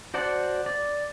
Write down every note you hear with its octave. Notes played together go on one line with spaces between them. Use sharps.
F#4 C5 D5 F#5 A5
D5